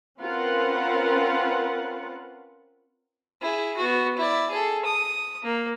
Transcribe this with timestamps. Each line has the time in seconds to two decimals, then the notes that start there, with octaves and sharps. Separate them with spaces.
0.19 C4 C#4 F4 A#4 B4 F#5
3.42 E4 G#4
3.77 B3 F#4
4.17 E4 D5
4.50 G#4 A4
4.85 D#6
5.43 A#3